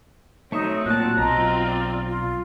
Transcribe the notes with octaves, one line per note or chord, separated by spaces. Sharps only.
F#3 A3 C4 D#4 C#5 E5
A#2 F#4 A5 F#6
B1 C4 F4 D#5 A#5
D5
F4